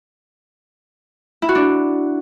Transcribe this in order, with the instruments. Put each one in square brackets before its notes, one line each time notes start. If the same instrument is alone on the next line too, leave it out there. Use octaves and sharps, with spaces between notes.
[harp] E4
F#4
D4